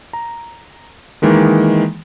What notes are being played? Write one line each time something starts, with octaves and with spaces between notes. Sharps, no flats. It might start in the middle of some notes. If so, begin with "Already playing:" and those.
A#5
D#3 E3 G#3 A#3